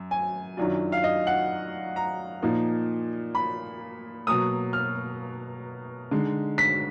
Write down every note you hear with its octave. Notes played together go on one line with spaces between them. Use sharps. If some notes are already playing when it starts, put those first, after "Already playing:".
Already playing: F#2
G#5
F#2 D#3 F#3 D4 F4
F5
D#5
F#5
A#5
A#2 F3 A#3 D#4
B5
B2 F#3 A#3 D#6
F6
D3 G#3 D#4
B6